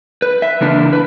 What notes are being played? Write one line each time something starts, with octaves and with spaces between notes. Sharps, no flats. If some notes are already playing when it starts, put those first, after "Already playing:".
B4
E5
C#3 E3 A#3 D4
B4